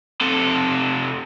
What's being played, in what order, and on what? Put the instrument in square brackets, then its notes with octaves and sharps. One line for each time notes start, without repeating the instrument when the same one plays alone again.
[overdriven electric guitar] C3 A4